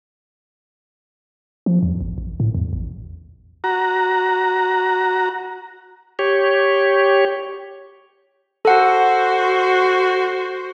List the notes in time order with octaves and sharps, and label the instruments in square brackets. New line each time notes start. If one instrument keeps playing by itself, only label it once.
[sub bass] F3
E2
A1
A1
A2
E2
A1
[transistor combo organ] F#4 A#5
[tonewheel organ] G4 C#5
[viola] F#4 C5 [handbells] A4 F#5